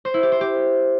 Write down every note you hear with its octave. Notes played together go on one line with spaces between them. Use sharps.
C5
E4
G4
C5
G4